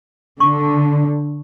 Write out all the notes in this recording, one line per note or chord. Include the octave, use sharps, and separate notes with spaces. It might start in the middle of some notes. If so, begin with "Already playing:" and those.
D3 C#6